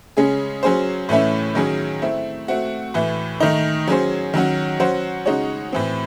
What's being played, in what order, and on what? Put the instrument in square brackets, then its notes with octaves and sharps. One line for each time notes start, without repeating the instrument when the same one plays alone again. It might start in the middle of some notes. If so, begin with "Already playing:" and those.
[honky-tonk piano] C#3 G#3 C#4 G#4
F#3 C#4 G#4 C5
A2 E3 A3 C#4 E4
D#3 F#3 C#4 G#4
A3 C4 E4
A3 C4 F#4
A2 E3 A3
D#3 A3 D#4
F#3 C#4 G#4 C5
D#3 F#3 C#4 F#4
F#3 C#4 F#4 C5
C#3 G#3 D#4 F#4 C#5
A2 E3 C4